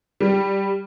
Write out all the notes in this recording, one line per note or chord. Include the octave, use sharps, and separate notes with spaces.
G3